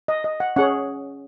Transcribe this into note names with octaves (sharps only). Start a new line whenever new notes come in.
D#5
D#5
F#5
C#4 G#4 C#5 F#5